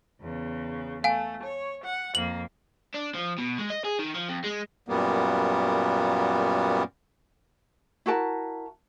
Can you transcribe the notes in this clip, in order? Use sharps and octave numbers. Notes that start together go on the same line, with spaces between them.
E2 C#3
A3 F5 G#5
C#5
F#5
F2 A#3 F#7
D4
F3
B2
G#3
D#5
G#4
D#3
F3
F2
G#3
F#2 A#2 G3 A#3 B3
E4 F#4 A#4 A5